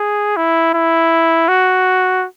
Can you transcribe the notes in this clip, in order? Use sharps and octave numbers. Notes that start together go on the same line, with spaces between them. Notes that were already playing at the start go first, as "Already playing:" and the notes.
Already playing: G#4
E4
E4
F#4